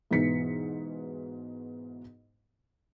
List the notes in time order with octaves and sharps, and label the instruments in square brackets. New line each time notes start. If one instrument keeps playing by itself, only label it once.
[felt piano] G#2 B2 E3 B3 B6 C#7